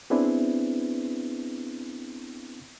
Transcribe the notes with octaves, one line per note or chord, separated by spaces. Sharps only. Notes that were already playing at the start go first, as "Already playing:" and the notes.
B3 C4 D4 E4 G#4 B4